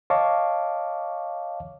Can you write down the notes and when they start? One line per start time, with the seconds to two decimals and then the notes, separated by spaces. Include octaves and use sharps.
0.10 C#5 D#5 F5 A5 C#6 D6